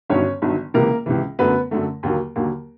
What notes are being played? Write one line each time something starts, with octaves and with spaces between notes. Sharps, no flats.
G1 G2 D#3 F#3 C#4 C#5
G1 G2 D#3 F#3
C#2 C3 E3 A#3 A#4
C#2 C3 E3
F#2 D3 F#3 A3 B3 B4
F#2 D3 F#3 A3
D#2 D3 F#3 A#3
D#2 D3 F#3 A#3